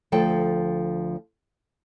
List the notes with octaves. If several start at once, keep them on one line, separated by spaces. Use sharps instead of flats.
D2 F3 A4 G5